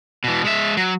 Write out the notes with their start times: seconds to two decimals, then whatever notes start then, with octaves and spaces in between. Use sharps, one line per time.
0.24 B2 E3
0.44 G#3 E5
0.77 F#3